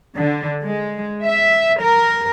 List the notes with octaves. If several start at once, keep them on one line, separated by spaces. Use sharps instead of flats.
D3
G#3
E5
A#4